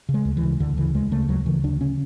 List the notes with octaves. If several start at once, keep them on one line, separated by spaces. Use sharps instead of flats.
C#3
G#3
D2
E3
C#3
D2 D3
C#3 E3
D2 G#3
C#3 A3
D2 F#3
C#3 E3
D2 D4
C#3 C#4